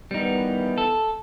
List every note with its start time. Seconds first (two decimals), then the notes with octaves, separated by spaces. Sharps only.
0.11 D#3 E3 G3 B3 D#4
0.78 A4